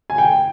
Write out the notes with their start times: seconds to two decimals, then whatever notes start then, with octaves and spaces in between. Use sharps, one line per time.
0.10 G#5
0.18 G5